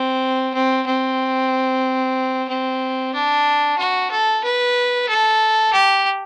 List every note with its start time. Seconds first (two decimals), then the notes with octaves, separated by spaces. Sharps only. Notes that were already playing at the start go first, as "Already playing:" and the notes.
Already playing: C4
0.54 C4
0.87 C4
2.49 C4
3.14 D4
3.78 F#4
4.11 A4
4.44 B4
5.09 A4
5.73 G4